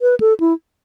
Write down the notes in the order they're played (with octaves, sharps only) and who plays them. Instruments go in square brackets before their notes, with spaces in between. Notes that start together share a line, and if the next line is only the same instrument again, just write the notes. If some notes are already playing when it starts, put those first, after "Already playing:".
[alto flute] B4
A4
E4